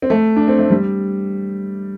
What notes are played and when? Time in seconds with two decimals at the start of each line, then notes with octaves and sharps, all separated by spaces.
0.02 C4
0.10 A3
0.36 D4
0.48 C4
0.59 A3
0.70 G3